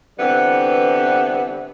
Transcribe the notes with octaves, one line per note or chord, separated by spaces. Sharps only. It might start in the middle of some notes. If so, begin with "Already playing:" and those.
D3 E3 G3 B3 C4